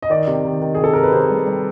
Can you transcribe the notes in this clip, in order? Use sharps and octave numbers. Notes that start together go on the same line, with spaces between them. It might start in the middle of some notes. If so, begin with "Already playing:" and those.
D#5
D#3 D5
C3
D#3
D#3
C3 G#4
A4
C3 A#4
B4
C3 C5
G3
G3